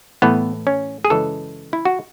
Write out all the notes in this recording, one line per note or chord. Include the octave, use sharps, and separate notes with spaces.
A2 E3 A3 B3
C#4
G#4
F#2 C#3 E3 G#3 A4
E4
F#4